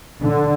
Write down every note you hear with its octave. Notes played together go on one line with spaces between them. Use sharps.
D3